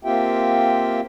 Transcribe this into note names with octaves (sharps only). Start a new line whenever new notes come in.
A#3 C4 F4 G4 E5 G5